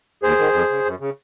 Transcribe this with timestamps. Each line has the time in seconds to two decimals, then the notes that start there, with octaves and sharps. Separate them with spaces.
0.23 D#2 G#4 C5
0.39 D#3
0.53 F2
0.70 C#3
0.85 F#2
1.00 C#3